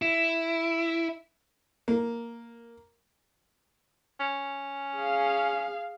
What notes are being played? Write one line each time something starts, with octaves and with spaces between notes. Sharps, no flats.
E4
A#3
C#4
G#4 F5